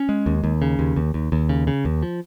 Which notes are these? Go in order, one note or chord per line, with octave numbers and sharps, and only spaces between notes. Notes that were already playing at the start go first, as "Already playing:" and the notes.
Already playing: C#4
G#3
D#2
D#2
C#3
D#2
D#2
D#2
D#2
C#3
C#3
D#2
F3